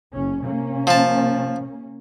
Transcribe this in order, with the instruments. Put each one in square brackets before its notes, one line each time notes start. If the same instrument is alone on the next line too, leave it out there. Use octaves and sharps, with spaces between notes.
[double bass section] F#1 C#4
C3 A#3 C#4
[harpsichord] F3 A5